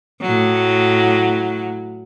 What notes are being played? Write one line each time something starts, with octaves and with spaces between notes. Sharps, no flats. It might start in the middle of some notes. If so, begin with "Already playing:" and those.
A2 F#3